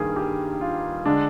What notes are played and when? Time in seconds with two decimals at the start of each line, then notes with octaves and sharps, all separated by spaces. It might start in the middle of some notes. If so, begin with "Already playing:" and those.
Already playing: G2 D#3 G3 A#3 G#4
0.16 G4
0.61 F4
1.05 D3 G#3 D4